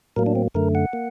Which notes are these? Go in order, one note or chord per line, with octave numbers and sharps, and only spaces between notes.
A2 F#3 A#3 A#4
D4
C4
F#2 D3 A3 A#4
F#5
A#3